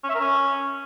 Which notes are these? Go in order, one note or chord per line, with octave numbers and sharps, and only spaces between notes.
C#4
E5
A#4
C#4